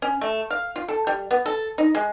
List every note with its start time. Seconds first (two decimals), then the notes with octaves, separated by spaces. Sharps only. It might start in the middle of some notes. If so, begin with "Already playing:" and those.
0.02 C#4
0.21 A3
0.50 F5
0.76 F4
0.88 A4
1.07 G3
1.31 B3
1.46 A4
1.78 D#4
1.95 G#3